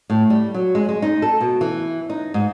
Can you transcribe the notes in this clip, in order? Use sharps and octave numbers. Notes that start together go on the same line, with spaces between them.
A2
G3
F#3
G#3
G#3
D#4
A4
B2
E3
D#4
G#2